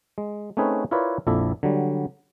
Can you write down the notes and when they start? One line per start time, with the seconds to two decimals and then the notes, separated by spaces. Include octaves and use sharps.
0.18 G#3
0.57 A3 C4 C#4 D#4 G#4 B4
0.91 E4 F4 A#4 B4 C#5 D5
1.27 A#1 F2 E4 A4 D5
1.63 D3 F#3 G3